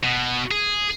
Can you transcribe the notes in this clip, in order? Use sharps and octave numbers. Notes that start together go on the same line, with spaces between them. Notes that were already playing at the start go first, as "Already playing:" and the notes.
B2
G#4